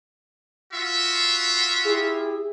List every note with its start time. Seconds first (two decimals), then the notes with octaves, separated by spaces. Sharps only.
0.71 F4 F#4 E5
1.85 E4 G4 G#4